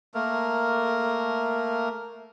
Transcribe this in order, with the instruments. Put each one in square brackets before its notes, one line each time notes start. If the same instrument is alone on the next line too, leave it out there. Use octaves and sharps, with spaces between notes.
[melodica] A3 A#3 A#4